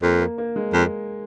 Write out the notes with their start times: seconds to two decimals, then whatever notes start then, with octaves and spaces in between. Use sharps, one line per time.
0.02 F2 A#3
0.21 A#3
0.38 A#3
0.56 G#3
0.73 F2